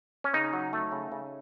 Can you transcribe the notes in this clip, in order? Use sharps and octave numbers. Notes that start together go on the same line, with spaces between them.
C#4
C#3 D#4
F#3
A3
C#3
C#3